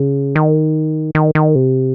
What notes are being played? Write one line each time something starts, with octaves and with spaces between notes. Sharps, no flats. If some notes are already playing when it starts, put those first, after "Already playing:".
Already playing: C#3
D#3
D#3
D#3
C3